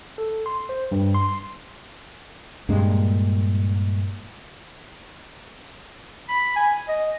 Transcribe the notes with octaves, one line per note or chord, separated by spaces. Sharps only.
A4
C6
C5
G2
C6
G2 A#2 G#3
B5
G#5
D#5